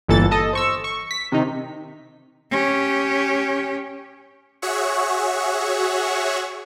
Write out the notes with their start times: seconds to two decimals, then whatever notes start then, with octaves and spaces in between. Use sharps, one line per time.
0.08 G1 A#2 E3 A4 A6
0.31 A4 D#5
0.53 C5 C#6 E6
0.84 C#6
1.11 B6
1.32 C3 D#3 D#4
2.51 C#4 G4
4.62 F#4 G#4 C#5 E5 F#5 C#6